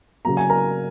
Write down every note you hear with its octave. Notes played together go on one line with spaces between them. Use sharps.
C#3 F#3 A#3 A#5
G#5
A#4 A#5